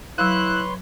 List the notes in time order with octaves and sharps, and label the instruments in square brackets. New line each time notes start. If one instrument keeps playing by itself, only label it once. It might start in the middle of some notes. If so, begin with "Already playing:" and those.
[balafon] F#3 F5 [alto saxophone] E4 [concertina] B4 C#5 C6 [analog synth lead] F#6